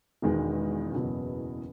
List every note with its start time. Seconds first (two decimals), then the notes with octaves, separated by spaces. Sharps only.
0.22 E1 E2 D#3 G#3
0.93 F#1 E2 B2 F#3